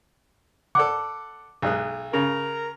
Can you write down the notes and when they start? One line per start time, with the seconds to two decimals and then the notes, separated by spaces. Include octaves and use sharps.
0.75 A4 D5 F#5 D6
1.62 B1 G#3 F#6
2.13 C#3 A#4